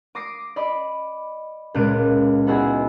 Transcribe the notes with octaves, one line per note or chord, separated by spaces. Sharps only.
D6 D#6 A#6 C7 D7
D5 D#5 B5
C#2 A#2 G#3 F#6 D7 D#7
B3 D#4 E4 F#4 G#4 D#5